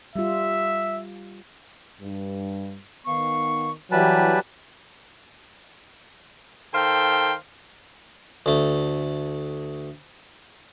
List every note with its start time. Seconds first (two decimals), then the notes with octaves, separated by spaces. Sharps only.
0.16 G3 F4 E5
2.01 G2
3.07 D#3 B3 F5 C#6
3.91 E3 F#3 G3 G4 B4 E5 G#5 A5
6.74 D#3 A4 C5 F5 G5
8.46 D2 A3